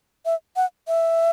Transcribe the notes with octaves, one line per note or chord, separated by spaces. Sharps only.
E5
F#5
E5